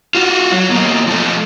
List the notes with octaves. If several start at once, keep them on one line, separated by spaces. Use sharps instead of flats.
F4 F#4
F#3
E2 A#3
F3 A3